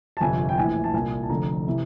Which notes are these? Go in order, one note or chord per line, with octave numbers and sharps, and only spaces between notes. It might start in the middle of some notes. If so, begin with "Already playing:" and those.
A5
G1 F2 C3 G#5
G5
A#1 A2 E3 G#5
A5
C2 A#2 G#5
A5
F1 F2 D3 A#5
C3 E3